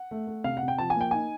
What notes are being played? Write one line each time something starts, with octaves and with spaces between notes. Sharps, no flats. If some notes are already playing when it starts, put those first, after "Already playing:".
Already playing: F#5
A3
A3
C3 F5
F#5
C3
G5
F3 A5
G#5
A#3 G5
D#4 G#5